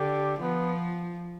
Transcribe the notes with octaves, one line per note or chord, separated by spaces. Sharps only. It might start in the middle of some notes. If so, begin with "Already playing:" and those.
Already playing: D3 G4
F3 B3